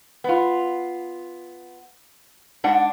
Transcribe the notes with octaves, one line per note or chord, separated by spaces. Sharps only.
B3 F4
G#2 D4 F#5